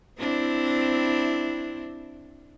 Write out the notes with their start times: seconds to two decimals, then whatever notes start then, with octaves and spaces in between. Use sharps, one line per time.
0.19 C4 D4 E4